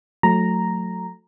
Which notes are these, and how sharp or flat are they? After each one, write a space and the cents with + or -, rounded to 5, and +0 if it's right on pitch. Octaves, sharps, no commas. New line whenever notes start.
F#3 -30 A3 +0 A#5 +0